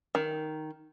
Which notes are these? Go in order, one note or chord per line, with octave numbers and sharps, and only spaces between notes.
D#3